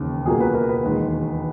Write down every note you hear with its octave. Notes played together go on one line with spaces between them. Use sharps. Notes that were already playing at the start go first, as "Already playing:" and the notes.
Already playing: E1 D#2 C#3
C#2 B2 F#3 A#3 G#4
B4
A#4
B4
E1 D#2 D#3 G#3